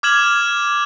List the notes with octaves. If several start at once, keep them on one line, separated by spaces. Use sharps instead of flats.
D6 F6 G#6 E7 F#7